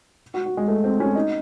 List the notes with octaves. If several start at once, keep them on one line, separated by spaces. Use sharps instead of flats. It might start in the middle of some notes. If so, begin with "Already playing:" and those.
F#4
F#4
G#3
A3
C4
C#4
D#4